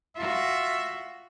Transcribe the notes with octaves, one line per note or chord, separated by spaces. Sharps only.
F4 F#4 E5